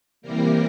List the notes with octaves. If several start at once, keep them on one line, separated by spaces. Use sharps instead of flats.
C3 E3 G3 A#3 A#4